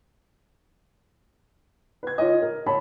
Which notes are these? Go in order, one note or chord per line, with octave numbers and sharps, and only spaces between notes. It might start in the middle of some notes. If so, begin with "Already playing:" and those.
B4 G#6
F4 C#5 D#5
A#4
C#5 A5 B5